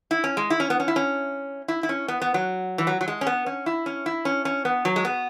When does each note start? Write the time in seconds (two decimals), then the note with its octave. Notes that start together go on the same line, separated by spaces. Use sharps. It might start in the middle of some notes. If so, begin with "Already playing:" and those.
0.11 E4
0.24 C#4
0.37 G#3
0.50 E4
0.60 C#4
0.70 B3
0.80 C#4
0.88 E4
0.96 C#4
1.68 E4
1.83 E4
1.89 C#4
2.08 B3
2.22 B3
2.34 F#3
2.78 E3
2.87 F#3
3.01 F#3
3.08 G#3
3.21 C#4
3.27 B3
3.46 C#4
3.66 E4
3.86 C#4
4.06 E4
4.25 C#4
4.45 C#4
4.65 B3
4.85 F#3
4.96 G#3
5.05 B3